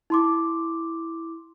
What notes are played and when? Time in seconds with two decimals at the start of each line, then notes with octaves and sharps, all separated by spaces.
0.10 E4 C6 D6